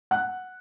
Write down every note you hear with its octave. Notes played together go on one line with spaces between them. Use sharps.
F#5 F#6